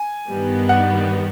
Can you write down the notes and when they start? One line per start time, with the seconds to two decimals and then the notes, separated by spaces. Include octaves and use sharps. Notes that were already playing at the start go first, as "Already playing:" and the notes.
Already playing: G#5
0.29 G2 D#3 G3 B3
0.69 F#5